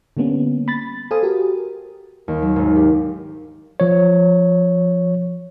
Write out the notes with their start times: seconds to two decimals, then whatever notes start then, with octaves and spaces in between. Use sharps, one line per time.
0.17 D3 G3 A#3 B3 C#4
0.68 B5 A6
1.11 A4 C5 F5 G#5 D#6
1.23 F#4 G4 A#4
2.28 D#2
2.42 F#3
2.56 G#1
2.76 G4
3.80 F3 C#5